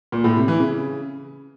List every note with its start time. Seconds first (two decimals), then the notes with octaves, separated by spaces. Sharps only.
0.12 A#2
0.24 A2
0.36 C3
0.48 E3
0.60 C#3